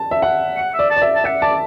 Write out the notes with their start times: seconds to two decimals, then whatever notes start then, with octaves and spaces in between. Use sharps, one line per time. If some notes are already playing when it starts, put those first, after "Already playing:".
Already playing: A5
0.11 E5
0.22 F#5
0.57 F#5
0.73 E5
0.79 D5
0.90 A5
0.97 D5
1.02 E5
1.15 A5
1.24 E5 F#5
1.42 D5 A5